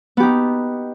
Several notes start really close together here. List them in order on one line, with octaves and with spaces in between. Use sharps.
B3 G4 D#4